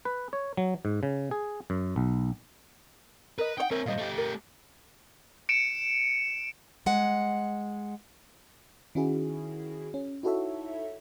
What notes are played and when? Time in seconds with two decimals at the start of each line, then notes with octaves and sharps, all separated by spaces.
0.05 B4
0.33 C#5
0.57 F#3
0.85 G#2
1.03 C#3
1.31 G#4
1.70 F#2
1.96 B1
3.38 A#4 B4 D#5
3.58 D#4 C#5 F#5 G5
3.71 C4 A#4 C#5 E5
3.86 A#2 G3 C5 D#5 F5
3.98 A3 G4
4.18 A#4
5.49 C#7 D7 E7
6.86 G#3 F#5
8.95 D#3 C#4 E4 F#4 G#4
9.94 C#4
10.23 D#4 E4 F#4 A4 C#5 E5